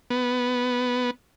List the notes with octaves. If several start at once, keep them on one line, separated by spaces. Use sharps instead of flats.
B3